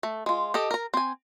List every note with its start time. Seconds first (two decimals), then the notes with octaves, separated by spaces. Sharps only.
0.03 A3
0.26 G#3 F4
0.54 G4 A4 D#5
0.71 A#4 A#5
0.94 C4 G#5